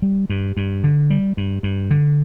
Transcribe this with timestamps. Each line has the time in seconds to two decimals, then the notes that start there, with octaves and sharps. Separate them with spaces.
0.02 G3
0.30 G2
0.57 G2
0.84 D3
1.10 G3
1.37 G2
1.63 G2
1.91 D3